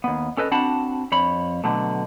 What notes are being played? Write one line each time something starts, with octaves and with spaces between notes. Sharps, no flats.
D#2 B3
C#4 A4 B4 D#5
C4 D4 F#4 F#5 A5 B5
F2 C#5 B5
B2 D3 F#3 A3